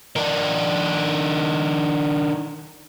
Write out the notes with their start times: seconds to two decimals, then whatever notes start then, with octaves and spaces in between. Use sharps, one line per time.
0.16 D#3 D4